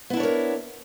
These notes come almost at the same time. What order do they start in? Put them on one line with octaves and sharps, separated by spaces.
B3 E4 D4 C#5 A#4